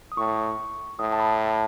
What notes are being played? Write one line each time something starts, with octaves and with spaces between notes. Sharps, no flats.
D#6
A2 C#6
A2 D#6
A5
B5
A5